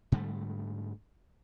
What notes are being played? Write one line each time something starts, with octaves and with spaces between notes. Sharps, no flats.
G#2 D3 G3 A3